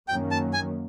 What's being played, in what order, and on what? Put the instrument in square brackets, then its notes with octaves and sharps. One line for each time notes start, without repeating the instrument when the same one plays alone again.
[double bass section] F#2 D#3 F#3 A#3 C#4 [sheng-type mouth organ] G5
[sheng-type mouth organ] A5
G#5